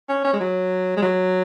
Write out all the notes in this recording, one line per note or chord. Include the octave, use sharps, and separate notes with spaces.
C#4
C#4
G#3
F#3
G#3
F#3